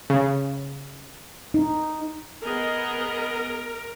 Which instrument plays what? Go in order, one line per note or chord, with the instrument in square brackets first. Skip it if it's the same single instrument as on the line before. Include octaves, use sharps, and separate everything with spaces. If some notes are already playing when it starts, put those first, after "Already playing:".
[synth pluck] C#3
[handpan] D#4
[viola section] B3 G#4 D#5 [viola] A#4